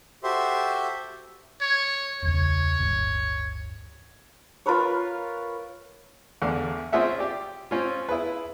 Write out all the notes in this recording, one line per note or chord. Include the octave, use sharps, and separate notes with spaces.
F#4 G4 A4 C5 E5 C6
C#5
E1 C#2 C#5
D1 G1
F4 A#4 B4 C#5
A1 E2 D3 F5
C4 C#4 F4 G#4 E5 F#5
G4 D5
C4 C#4 F4
E4 G#4 B4